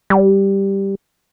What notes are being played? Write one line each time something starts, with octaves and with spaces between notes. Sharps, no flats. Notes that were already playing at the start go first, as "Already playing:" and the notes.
G3